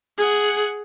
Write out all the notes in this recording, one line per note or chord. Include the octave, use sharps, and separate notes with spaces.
G#4 F#5